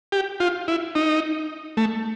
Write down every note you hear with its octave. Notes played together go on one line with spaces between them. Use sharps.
G4
F4
E4
D#4
A3